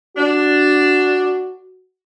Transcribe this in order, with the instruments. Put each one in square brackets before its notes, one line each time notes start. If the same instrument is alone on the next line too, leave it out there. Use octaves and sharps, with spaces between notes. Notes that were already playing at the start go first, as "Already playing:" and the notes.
[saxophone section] D4 [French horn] F#4